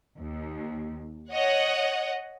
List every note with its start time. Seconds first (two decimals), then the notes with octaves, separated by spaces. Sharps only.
0.18 D#2
1.31 C#5 D#5 F#5